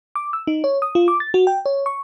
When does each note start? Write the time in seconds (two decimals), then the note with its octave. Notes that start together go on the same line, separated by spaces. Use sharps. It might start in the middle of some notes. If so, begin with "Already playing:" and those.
0.16 D6
0.33 E6
0.47 D#4
0.64 C#5
0.82 D#6
0.95 F4
1.08 D6
1.20 A6
1.34 F#4
1.47 G5
1.66 C#5
1.86 C#6